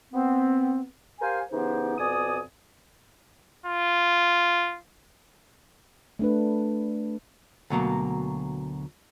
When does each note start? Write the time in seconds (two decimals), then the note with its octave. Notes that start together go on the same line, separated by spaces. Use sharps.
0.14 B3 C4
1.21 G4 A#4 C5 F5 G#5
1.51 C#3 E3 B3 D#4 G4 C5
1.98 F2 B2 D5 G#5 D#6
3.66 F4
6.19 A3 D4 B4
7.70 D2 B2 F#3 A#3